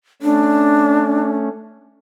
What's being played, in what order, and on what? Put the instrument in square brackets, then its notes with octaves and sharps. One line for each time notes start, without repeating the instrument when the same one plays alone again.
[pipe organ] A3 C#4 [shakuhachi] D4